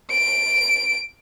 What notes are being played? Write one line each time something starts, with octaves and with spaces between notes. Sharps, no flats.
D7